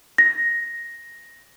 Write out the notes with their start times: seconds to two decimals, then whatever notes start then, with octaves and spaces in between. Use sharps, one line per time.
0.18 A#6